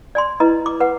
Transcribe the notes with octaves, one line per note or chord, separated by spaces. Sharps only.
D5 G#5 C6
E4 B4 D#5 A#5
D6
B4 F#5